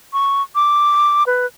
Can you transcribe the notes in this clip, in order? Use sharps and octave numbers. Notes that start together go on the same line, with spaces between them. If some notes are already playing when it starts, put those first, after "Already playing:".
C#6
D6
B4